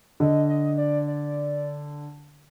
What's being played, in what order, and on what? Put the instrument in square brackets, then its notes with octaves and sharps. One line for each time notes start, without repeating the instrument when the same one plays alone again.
[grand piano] D3 [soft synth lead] D#5
[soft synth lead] D#5
D5
D5